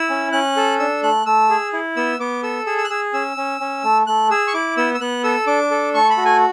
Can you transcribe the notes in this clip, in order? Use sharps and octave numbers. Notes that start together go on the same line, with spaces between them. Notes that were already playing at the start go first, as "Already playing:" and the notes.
Already playing: E4 E6
C#4
C#4 F#6
A4
D4 E6
A3 F#6
A3 E6
G#4
E4
B3 E6
B3 D6
A4 E6
G#4 E6
E6
F#6
G#4 E6
C#4 E6
C#4
C#4
A3
A3 F#6
G#4 E6
C#6
E4 D6
B3 E6
E6
B3 F#6
A4 E6
D4 D6
A4
A3 C#6
B5
F#4
G#5